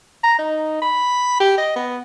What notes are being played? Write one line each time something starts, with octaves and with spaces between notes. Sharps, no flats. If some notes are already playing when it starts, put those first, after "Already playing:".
A#5
D#4
B5
G4
D#5
B3